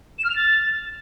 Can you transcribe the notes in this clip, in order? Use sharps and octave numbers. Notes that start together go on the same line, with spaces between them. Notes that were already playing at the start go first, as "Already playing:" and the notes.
E7
F6
F7
A6